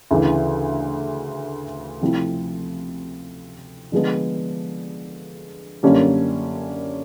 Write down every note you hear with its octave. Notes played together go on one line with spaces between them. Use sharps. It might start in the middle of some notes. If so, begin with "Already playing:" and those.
D2 C#3 E3
C3 F3 A3 C4 E4
D3 F3 G#3 B3
F#2 D3 G3 A#3 C#4